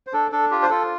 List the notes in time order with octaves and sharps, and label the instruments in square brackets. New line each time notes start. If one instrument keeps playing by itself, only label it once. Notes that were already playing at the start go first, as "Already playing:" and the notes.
[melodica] C5
D4 A4
D4 A4
F4 G4
C5
F4 A4